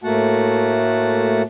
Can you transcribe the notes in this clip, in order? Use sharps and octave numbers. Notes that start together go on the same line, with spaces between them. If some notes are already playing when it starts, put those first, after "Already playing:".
A2 A3 A#3 F#4 F#5 A5